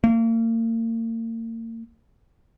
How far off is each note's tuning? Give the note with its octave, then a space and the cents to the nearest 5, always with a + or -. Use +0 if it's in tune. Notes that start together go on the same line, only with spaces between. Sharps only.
A#3 -40